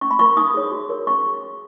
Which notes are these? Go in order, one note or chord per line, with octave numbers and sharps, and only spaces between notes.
C#4 C#6
B5
F4 A#4 C#6
D#4 D#6
G#4 C#5
F#4
A#4 C#5
C#4 C#6
F4 G#4
C#4